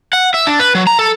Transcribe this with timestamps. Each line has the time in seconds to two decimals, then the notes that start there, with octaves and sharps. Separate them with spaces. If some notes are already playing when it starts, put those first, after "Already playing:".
0.13 F#5
0.34 E5
0.47 D4
0.60 B4
0.75 F#3
0.87 A#5
0.99 A4